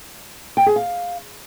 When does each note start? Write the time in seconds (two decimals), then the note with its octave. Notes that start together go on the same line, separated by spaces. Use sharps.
0.57 G5
0.66 G#4
0.76 F5